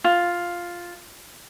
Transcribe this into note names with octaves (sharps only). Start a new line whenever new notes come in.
F4